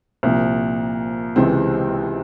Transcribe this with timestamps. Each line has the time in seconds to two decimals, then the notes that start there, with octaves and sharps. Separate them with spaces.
0.23 C2 A#2 F3
1.36 C#2 C3 E3 G#3 C4